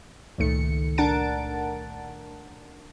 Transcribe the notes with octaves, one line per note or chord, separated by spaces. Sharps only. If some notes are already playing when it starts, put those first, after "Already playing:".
G#1 C#2 A#2 D#3 A3 C#7
D4 A#4 F#5 A5 A6 D7